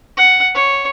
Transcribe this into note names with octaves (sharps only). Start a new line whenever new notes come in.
F#5
C#5